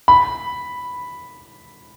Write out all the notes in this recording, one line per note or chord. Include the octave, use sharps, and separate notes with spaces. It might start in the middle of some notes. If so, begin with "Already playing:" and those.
B5